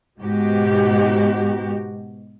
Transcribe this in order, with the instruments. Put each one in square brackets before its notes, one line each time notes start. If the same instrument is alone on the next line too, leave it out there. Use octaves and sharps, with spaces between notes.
[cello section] G#2 B2 F#4 G4